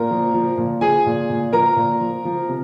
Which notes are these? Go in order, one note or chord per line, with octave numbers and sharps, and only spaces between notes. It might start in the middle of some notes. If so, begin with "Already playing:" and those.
Already playing: A#2 A#4 A#5
F3
F3
A#2
F3 G#4 G#5
A#2
A#2
F3 A#4 A#5
A#2
F3
F3
C3